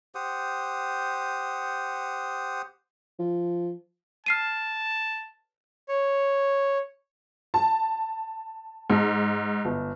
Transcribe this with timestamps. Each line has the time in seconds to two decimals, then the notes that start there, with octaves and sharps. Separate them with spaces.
0.15 G4 C5 F#5 D#6
3.19 F3
4.26 A5 F6 C7 D#7
5.88 C#5
7.54 A5
8.90 G#2
9.65 G1